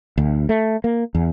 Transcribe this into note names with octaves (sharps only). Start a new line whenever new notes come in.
D2
A3
A#3
E2